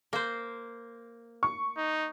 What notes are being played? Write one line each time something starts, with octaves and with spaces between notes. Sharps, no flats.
A#3 C5
C#6
D#4